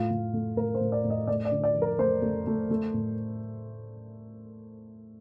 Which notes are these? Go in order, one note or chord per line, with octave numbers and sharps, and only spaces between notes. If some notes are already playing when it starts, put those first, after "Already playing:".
Already playing: A2 F4
A2
A3
A2 A#4
C5
A2
D5
A2
D#5
A3 D5
D5
D3
D5
F3
A#4
A3 C5
A3
A3
A3
A2